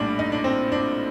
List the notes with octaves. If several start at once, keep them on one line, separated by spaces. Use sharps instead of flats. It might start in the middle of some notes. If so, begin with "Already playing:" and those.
Already playing: A#1 A2 G3 D4
D#4
D4
C4
D4